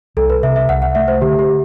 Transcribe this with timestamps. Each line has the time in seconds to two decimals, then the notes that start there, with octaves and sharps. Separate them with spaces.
0.16 C2 A4
0.30 B4
0.43 C3 E5
0.56 E5
0.69 C2 F#5
0.82 F#5
0.95 A3 E5
1.08 C5
1.21 D3 G4
1.39 G4